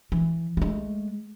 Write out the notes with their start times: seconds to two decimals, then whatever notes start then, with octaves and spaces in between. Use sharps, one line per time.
0.12 E3
0.57 G#3 A3